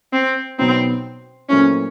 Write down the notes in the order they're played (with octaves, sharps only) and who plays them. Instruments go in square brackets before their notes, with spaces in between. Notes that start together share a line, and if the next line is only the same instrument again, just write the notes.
[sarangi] C4
[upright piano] B2 F#3 B3 D#4 [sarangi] C4
[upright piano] A#2 F#3 A3 C4 E4 [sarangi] C#4